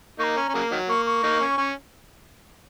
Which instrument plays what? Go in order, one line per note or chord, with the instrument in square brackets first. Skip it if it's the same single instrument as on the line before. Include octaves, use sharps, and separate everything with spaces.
[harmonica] A#3 D#4 [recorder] A#5 C#6
[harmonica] C#4
C#4
C#3 F#3 A#3
D#3 F#3
[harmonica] A#3 [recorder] C#6
[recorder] C#6
[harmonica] A#3 D#4
C#4
C#4